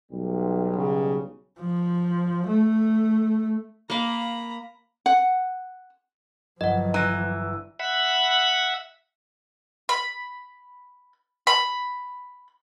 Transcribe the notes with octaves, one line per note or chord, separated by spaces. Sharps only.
B1 G3
C#3
F3
A3
A#3 F5 A#5 B5
F#5
G1 F3 F#3 D#5 F#5
E3 A#5 A#6
E5 F#5 B5
B5
B5